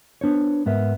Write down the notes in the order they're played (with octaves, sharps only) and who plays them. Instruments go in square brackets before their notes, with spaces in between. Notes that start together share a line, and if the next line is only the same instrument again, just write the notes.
[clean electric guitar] B3 D4 C5 C#5
G#2 B3 A#4 E5